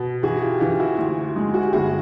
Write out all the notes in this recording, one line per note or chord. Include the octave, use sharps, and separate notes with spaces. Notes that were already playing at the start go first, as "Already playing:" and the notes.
Already playing: B2
E3 F#4 G#4
F4 G4
E3 F4 G4
E4 F#4
D2
G#3
F#4
G4
G1 F#4 G#4